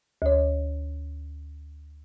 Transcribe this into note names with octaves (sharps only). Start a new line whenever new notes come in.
D2 C#5